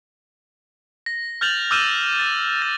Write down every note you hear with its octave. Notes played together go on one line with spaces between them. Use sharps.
A#6
F6 G6 A6 F7 F#7
D6 E6 F6 G6 D#7 E7
A6
A6